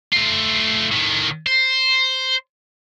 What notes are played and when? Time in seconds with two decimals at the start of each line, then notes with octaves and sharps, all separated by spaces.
0.12 A3 F4
0.92 A2 D#3
1.47 C5